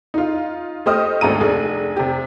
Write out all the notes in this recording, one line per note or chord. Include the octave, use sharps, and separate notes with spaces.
D#4 F4
A3 G4 C5 D#5 D#6 F6
G#1 D2 A4 A#5 D#7
F1 G#4
C3 G4